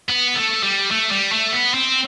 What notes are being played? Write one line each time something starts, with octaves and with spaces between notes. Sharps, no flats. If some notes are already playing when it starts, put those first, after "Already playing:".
B3
A3
G3
A3
G3
A3
B3
C4